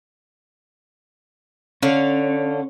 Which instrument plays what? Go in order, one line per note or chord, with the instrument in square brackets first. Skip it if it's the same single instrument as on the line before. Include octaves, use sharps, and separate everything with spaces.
[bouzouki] D3 F5 [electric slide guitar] C#4